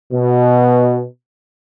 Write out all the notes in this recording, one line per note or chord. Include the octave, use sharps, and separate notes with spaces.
B2